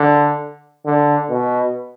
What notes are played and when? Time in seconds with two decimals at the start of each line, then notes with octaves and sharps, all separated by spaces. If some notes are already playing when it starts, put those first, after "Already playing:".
Already playing: D3
0.86 D3
1.30 B2